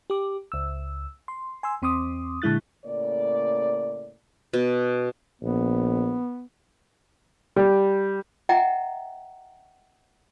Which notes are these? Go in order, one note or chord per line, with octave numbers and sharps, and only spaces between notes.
G4 D6
C#2 E6
C6
G#5 C6 E6
E2 C4 C6 D6 D#6
A#2 D3 G#3 E4 F#6 A6
A2 C#3 A#3 D5
B2
A#1 B3
G3
D#5 E5 F#5 G5 A#5